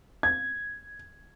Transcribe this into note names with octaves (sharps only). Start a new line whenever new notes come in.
G#6